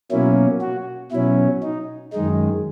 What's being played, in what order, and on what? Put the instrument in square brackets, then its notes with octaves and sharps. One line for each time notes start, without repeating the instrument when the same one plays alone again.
[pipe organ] B2 F#3 A#3 C#4 E4
F#4
B2 F#3 C#4 E4
D#4
F#2 D#3 G#3 D#4